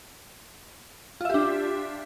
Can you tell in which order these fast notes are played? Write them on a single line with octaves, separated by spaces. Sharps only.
F4 E5 G4 D4